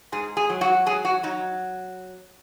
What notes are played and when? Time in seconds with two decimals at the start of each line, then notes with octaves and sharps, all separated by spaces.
0.12 G#2 G#4
0.37 G#4
0.50 F#3
0.61 F#4
0.86 F#3 G#4
1.05 F#4
1.23 F#3 D#4